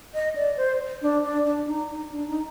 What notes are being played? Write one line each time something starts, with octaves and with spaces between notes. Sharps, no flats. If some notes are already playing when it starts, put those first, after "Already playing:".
D#5
D5
C5
D4
D4
D4
D#4
D#4
D4
D#4